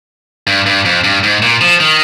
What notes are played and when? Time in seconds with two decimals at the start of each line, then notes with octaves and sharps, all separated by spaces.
0.47 G2
0.66 G2
0.85 F2
1.04 G2
1.23 G#2
1.42 A#2
1.61 F3
1.80 D#3